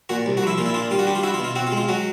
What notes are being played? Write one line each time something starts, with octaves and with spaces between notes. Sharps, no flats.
A#2 F#4
C2
F#4
F3 E4
A#2 F4
E4
D4 F4
G3 F4
F#4
D4 G4
F4
E4 F#4
F4
B2
F4
C4 F#4
F4
G#3
F4
F#3 F#4